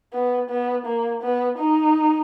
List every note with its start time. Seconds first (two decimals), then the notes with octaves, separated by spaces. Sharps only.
0.13 B3
0.50 B3
0.86 A#3
1.23 B3
1.59 D#4